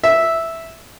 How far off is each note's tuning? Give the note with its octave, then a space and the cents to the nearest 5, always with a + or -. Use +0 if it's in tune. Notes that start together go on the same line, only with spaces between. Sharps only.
E5 -5